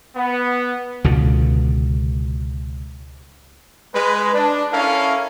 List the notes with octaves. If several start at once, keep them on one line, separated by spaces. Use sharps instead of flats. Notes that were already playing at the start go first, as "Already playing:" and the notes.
B3
C#2 B2 D3
G#3 B4
D4
C#4 E4 A4 A#4 F5